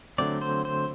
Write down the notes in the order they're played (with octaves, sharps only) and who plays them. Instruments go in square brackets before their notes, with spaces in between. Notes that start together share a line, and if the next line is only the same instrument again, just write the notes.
[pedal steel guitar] D3 F#3 A3 C4 D5
C5
C5